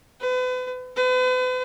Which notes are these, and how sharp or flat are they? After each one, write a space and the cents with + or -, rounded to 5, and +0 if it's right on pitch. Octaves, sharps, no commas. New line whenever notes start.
B4 +40
B4 +40